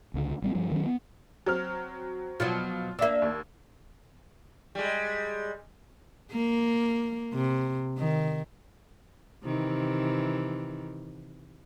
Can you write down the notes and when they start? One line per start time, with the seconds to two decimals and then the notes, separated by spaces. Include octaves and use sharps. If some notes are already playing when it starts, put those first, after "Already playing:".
0.14 C#2 D3
0.42 A1 G3 C4
0.55 G2 F3 G3
0.72 D#3 F#3 C#4
0.86 B3
1.46 F#3 C4 F6
2.40 B2 F3 F#3 F4
2.99 A#3 D4 E5 E6
3.22 D#2
4.75 G3 G#3
6.32 A#3
7.33 C3
7.98 D#3
9.44 C3 D#3 E3